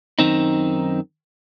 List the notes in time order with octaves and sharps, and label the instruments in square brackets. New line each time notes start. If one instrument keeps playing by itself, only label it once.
[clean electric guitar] F#2 D#3 C4 D#4